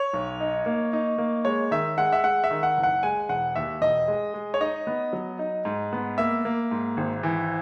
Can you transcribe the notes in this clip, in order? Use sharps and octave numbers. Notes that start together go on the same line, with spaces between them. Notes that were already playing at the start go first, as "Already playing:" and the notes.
Already playing: C#5
B1
D#4
A#3
D#4
A#3
G#3 C#5
D#3 E5
G#3 F#5
E5
G#3 F#5
E5
D#3
F#5
F#1
F#5
G#3 G#5
E1 F#5
D#2 E5
E1 D#5
G#3
G#3
C#5
D#4 D#5
B3
F#3
D#4
G#2
B3
A#3 E5
A#3
G#2
G#1
E3